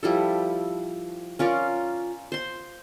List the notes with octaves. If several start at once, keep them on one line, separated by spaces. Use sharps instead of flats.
F3 G3 E4 A4
C#4 F4 A#4 D5
C5 C6